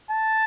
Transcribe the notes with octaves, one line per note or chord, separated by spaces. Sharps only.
A5